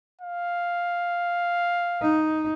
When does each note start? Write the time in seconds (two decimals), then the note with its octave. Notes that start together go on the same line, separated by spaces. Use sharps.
0.21 F5
2.02 D#4